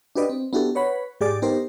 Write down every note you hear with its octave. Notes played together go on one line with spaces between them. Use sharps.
D4 F#4 G4 B4 D5 D#5
C4
B3 D4 E4 F#4 G4 A4
B4 C#5 F#5 B5
G#2 G4 G#4 D5 D6 A6
B3 D#4 G4 A#4 C5